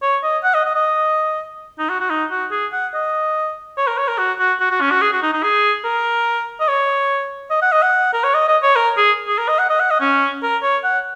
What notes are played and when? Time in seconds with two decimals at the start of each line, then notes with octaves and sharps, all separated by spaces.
0.02 C#5
0.23 D#5
0.44 F#5
0.54 D#5
0.65 D#5
0.75 D#5
1.79 D#4
1.89 F#4
2.00 F#4
2.10 D#4
2.31 F#4
2.51 G#4
2.72 F#5
2.94 D#5
3.77 C#5
3.87 A#4
3.98 C#5
4.08 A#4
4.18 F#4
4.39 F#4
4.60 F#4
4.70 F#4
4.81 C#4
4.91 F#4
5.01 G#4
5.12 F#4
5.22 D#4
5.33 D#4
5.43 G#4
5.84 A#4
6.60 D#5
6.68 C#5
7.50 D#5
7.62 F#5
7.72 D#5
7.82 F#5
8.13 A#4
8.24 C#5
8.34 D#5
8.48 D#5
8.62 C#5
8.76 A#4
8.97 G#4
9.28 G#4
9.38 A#4
9.48 D#5
9.59 F#5
9.70 D#5
9.80 F#5
9.90 D#5
10.00 C#4
10.43 A#4
10.63 C#5
10.84 F#5